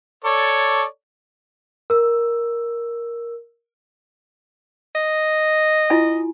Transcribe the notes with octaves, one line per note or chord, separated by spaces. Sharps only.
A4 C#5 D5
A#4 E6
D#5
E4 F4 G#5